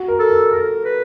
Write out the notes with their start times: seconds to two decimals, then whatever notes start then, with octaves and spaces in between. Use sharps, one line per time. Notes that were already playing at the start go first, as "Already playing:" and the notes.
Already playing: F#4
0.08 A#4
0.19 A4
0.30 A#4
0.51 A4 A#4
0.84 B4